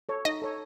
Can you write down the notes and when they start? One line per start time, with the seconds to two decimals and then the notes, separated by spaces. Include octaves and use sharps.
0.09 A4 C#5
0.25 D#4 D#5
0.42 A4 C#5